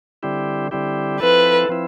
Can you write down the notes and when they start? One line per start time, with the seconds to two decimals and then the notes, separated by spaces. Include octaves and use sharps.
0.23 D3 G3 C4 E4 G4
0.71 D3 G3 C4 E4 G4
1.20 F3 C4 E4 A4 B4
1.69 F3 C4 E4